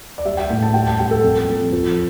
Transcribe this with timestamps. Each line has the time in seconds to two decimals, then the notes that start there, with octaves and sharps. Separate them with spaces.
0.18 D5
0.25 G3 E5
0.37 G5
0.50 A2 G5
0.62 A5
0.74 G3 G5
0.87 A5
0.99 G3 G5
1.11 A4
1.23 F2
1.48 F2
1.72 F3